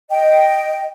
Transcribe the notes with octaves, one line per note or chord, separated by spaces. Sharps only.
D#5 G5